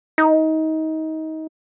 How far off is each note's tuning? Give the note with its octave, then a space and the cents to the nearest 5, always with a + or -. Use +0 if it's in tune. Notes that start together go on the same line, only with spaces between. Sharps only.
D#4 +25